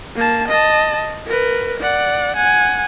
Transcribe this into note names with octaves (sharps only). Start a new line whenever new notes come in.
A#3 A5
D#5 A5
A#4 B4
D5 F#5
F#5 G#5